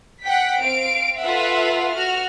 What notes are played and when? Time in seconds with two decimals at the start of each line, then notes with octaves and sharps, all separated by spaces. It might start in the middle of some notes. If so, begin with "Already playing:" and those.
0.23 F#5 G5 B6
0.61 C4 F5 D7
1.22 F4 A4 B4 E5 F#5
1.94 F#4 F6